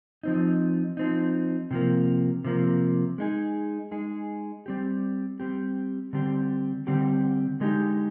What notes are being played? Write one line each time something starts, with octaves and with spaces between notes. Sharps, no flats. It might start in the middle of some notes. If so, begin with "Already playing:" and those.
F3 C4 D#4
F3 C4 D#4
C3 F3 A#3
C3 F3 A#3
G#3 D#4 G#4
G#3 D#4 G#4
G3 C4 G4
G3 C4 G4
D3 G3 C4 G4
D3 G3 C4 G4
D3 G#3 D#4 G4